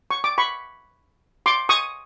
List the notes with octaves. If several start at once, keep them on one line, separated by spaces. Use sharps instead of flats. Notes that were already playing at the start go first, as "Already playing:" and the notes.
C#6
D6
B5 C#6
C6 D6
C#6 D#6